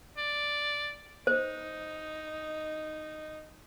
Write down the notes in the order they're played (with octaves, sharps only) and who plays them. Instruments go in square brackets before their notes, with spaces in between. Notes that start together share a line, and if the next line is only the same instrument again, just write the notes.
[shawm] D5
[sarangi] D#4 [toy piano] C5